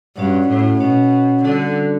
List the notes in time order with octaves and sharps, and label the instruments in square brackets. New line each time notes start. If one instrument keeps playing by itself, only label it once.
[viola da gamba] G2 [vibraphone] C#4 F#4 C#5 F#5
[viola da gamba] A2
[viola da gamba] B2 [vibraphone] C#4 F#4 C#5 F#5
[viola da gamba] D3 [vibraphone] G3 D4 F#4 A4 D5